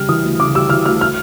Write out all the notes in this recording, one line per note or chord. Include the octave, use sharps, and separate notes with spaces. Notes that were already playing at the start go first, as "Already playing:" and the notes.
Already playing: C#3 G3 F6
E3 D#6
D2
C#3 D6
G3 E6
E3 F6
D2 F6
F6